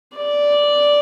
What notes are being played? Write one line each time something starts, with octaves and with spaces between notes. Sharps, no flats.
D5